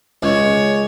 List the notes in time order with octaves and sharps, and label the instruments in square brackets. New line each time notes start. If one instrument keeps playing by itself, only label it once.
[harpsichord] C#2 [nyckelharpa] C#5